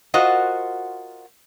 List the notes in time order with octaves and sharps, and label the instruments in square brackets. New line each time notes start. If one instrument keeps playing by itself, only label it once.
[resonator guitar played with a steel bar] F4 F#4 A#4 C5 D#5 F#5